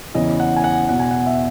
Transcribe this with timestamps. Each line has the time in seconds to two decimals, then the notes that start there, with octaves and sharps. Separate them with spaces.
0.14 E2 C#3 E3 D#5
0.40 F#5
0.56 G#5
0.64 F#5
0.89 E2 B2 F#5
1.00 G#5
1.11 F#5
1.26 E5